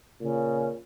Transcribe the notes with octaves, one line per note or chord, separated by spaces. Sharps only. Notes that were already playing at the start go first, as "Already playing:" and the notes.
A#2 C#3